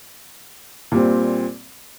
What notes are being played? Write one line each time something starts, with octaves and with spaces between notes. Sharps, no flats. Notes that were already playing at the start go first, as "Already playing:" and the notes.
A#2 G3 C4